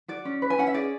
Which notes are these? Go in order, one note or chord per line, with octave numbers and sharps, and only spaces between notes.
F#4 D5
C#4
B4
G#5
C#4 F#5
E5
G#4 D5